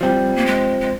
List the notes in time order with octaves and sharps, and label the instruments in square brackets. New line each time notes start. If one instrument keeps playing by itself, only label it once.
[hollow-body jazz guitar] F3 C4 G4 [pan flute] G3
[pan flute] A#3
G#3
G#3